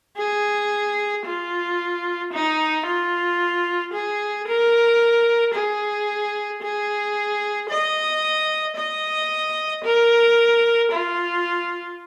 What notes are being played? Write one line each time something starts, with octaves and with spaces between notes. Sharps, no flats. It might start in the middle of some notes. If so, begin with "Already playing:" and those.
G#4
F4
D#4
F4
G#4
A#4
G#4
G#4
D#5
D#5
A#4
F4